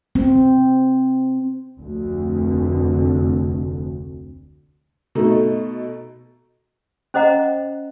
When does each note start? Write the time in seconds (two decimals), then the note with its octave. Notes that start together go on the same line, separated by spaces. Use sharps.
0.15 C4
1.78 F1 D2
5.15 B2 A3 D#4 A4
7.14 C#4 C5 D#5 F#5 A#5